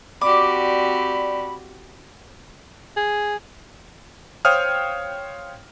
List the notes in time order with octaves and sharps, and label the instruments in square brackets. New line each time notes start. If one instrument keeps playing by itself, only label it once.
[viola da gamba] C4 F#4 G4 [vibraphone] D5 [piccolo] B5 [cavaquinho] D6
[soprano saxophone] G#4
[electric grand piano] C5 C#5 F5 G5 D#6 F6